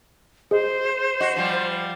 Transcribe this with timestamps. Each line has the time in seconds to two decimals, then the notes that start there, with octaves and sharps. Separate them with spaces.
0.51 G#4 C5 D#5
1.21 F#4 D#5
1.36 F3 G3